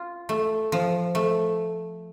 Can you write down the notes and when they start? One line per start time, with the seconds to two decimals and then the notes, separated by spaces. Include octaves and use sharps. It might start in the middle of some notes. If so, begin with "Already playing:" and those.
Already playing: F4
0.29 A3
0.72 F3
1.15 A3